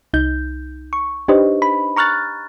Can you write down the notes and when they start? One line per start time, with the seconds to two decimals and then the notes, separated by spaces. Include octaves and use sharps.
0.14 C2 D#4 G6
0.93 C#6
1.28 D4 D#4 G4 B4 C5 D#5
1.62 B5
1.96 A#5 C#6 F6 F#6 A6